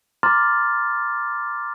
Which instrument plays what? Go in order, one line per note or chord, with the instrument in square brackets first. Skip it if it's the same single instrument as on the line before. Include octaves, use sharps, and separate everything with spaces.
[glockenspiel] A#5 C6 D6 F6 A6